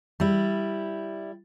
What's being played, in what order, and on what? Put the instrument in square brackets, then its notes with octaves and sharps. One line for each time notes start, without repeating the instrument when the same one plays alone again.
[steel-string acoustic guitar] G3 E4